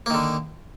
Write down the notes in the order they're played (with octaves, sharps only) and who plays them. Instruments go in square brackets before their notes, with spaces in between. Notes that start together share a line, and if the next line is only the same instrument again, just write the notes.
[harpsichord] A#3
D#3
D3